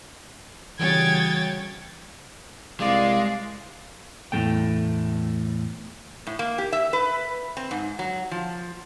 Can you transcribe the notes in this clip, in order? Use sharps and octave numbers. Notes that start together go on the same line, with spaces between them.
C#3 E3 G3 F#4 C#5 G5 G#6 A6
C2 G#3 D5 F5
E2 A2 G#3 A3 G5
A2
A#3
G4
E5
B4
C4
G#2
F#3
F3